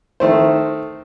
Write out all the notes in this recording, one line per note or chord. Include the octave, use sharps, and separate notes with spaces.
D#3 A3 C5